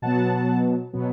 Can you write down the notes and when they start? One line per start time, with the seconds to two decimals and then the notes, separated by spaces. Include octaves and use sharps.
0.02 B2 F#3 B3 F#5 A5
0.93 B2 F#3 B3